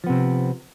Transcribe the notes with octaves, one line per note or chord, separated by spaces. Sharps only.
C3 F3 B3 C4